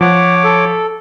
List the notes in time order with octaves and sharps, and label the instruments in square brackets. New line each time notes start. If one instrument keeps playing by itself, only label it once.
[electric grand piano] F3 [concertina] C#5 D6 [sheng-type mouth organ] F#5
[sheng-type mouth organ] A4